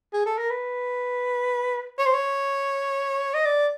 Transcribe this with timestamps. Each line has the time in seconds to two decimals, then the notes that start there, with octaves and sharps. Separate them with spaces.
0.13 G#4
0.26 A4
0.38 A#4
0.50 B4
1.98 C#5
2.06 C5
2.14 C#5
3.34 D#5
3.45 D5